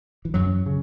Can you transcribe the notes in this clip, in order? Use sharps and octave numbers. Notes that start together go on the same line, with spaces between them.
E3
F#2 F#3
C#3